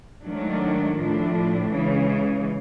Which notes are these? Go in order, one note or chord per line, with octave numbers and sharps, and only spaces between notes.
G#2 D#3 F#3 A3 D4
A2 F3 A3 D4
C#3 E3 G#3